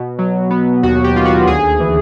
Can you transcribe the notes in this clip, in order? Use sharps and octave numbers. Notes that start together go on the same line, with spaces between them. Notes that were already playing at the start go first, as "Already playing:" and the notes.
Already playing: B2
F#3
B3
D#2 F#4
G4
D#2 F4
F#4
D2 G#4
E3